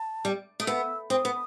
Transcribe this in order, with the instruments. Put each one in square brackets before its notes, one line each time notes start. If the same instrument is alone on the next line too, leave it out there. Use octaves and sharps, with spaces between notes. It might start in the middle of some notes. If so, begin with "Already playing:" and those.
Already playing: [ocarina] A5
[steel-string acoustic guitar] G3
[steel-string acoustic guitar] A3 [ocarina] D#6
[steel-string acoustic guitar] B3 [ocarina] E6
[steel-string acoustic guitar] C4 [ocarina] D#6
[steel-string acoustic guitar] B3